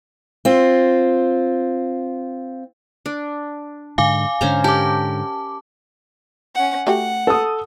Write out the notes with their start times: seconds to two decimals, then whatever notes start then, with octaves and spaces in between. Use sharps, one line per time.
0.45 C4 F4
3.06 D4
3.98 G#2 D3 F5 G#5 D6
4.41 G#2 D3 C#4 C5 A#5
4.64 G4 A#4 A5 D6
6.55 C#4 F#5
6.87 A3 F#4 G4 F#5
7.27 A4 D#6